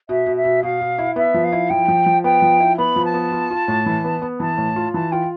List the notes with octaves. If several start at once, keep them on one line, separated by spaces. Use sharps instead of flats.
B2 E5
B2
E5
B2
B2 F5
B2
E4
B3 E5
F3
F5
E4
F3 G5
F3
F3
B3 G5
F3
E4
B3 B5
F3
A5
B3
F4
F4
A2
E3
B3
B3
E3 A5
A2
F4
E3 A5
F4 G5